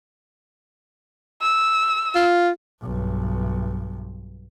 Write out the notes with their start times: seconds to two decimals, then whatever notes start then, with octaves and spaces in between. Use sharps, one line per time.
1.41 E6
2.15 F4
2.82 B1 G2